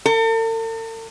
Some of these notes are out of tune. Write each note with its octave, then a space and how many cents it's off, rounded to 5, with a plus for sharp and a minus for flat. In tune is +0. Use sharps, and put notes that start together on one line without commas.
A4 +45